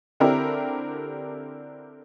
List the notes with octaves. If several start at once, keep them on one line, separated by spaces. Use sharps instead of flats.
D3 C4 D4 E4 G4 A#4